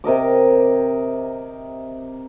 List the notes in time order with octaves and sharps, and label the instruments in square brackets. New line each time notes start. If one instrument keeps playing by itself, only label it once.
[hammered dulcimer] C3 A#4 D#5 D6